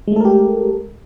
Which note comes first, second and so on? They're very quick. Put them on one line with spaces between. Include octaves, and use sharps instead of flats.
G#3 A3 A4 A#4 G4